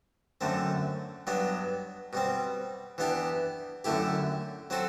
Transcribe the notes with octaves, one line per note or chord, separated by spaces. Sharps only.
F#2 D3 A3 C4
G2 F#3 B3 D4
B2 G3 C4
E3 B3 D4 G4
F#2 D3 A3 E4 G4
F#3 C4 F#4 A4